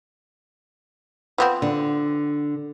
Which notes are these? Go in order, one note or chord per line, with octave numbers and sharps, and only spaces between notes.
F3 B3 C4
D3